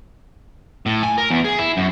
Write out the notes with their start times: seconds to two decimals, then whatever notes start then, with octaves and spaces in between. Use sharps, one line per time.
0.86 A2
1.03 G#5
1.18 A#4
1.30 E2
1.44 G#4
1.59 E4
1.77 F#2